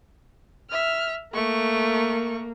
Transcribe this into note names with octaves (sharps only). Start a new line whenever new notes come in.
E5 F6
A3 A#3 C#6